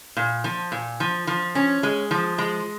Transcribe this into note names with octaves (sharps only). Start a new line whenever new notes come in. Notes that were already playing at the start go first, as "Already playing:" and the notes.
A#2
F3
A#2
F3
F3
C#4
G#3
F3
G#3